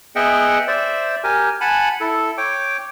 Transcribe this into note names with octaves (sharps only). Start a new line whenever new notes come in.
B3 G#4 D#5 E5 F#5 G5
C5 D5 E5
G4 A#4 G#5
F#5 G#5 A5 B5
E4 A4
C#5 G5 D6